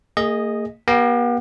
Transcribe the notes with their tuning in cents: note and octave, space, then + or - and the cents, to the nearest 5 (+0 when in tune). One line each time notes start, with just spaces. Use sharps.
A#3 -45 G#4 -20 D#5 +0
B3 -45 G4 +0 G5 -15